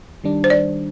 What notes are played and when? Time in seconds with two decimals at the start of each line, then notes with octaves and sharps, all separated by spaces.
0.24 D#3 G3 D4
0.44 C5
0.50 D5